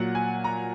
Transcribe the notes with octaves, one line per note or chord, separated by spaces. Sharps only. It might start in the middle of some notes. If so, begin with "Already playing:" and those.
Already playing: A#2 F#3 F#5
G#5
A#5